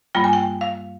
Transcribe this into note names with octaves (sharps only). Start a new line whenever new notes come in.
G2 G3 A#3 F4 G5
G#5
G5
F5